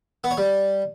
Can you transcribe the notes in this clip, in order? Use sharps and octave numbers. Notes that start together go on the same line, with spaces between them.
B3
C#5
G3